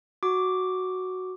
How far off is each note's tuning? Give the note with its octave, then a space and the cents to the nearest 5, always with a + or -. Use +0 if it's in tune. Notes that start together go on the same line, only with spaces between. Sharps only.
F#4 +0 D6 +0